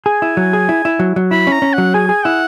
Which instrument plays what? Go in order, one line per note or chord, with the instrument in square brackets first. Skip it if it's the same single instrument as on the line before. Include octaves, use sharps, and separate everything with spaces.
[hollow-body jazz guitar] G#4 [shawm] G#5
[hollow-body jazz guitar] E4
F#3
G#4
E4
E4
F#3
F#3
[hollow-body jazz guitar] E4 [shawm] B5
[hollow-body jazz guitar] C#4
[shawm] A#5
[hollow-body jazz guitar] C#4
[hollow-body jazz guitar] F#3 [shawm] F#5
[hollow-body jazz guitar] G#4 [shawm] G#5
[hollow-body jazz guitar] G#4
[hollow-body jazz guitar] E4 [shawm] F#5